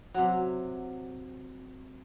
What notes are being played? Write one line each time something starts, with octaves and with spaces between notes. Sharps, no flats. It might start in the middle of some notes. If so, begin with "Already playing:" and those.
C3 F#3